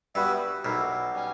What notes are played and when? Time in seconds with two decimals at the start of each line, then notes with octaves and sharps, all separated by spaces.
0.15 G2 G3 B3 F#4 B4 E5
0.64 B1 B2 E4 A#4 E5
1.13 G3 C#4